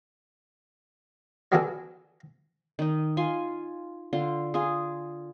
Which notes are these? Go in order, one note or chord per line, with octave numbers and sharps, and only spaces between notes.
F#3 B3 D4 F#4 G#4 A4
D#3 D#4
F4 G#5 C6
D3 F4 C6
F4 G#4